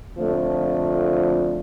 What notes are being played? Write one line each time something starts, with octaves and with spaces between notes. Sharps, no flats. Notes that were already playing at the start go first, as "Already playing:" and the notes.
F2 D3 F3 A3